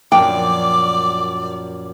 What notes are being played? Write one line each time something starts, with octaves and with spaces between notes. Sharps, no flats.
A#1 F#2 D5 G5 D6